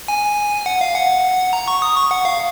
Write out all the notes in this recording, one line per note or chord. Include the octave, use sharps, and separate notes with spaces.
G#5
F#5
F5
F#5
A#5
C#6
D#6
C#6
F#5
F5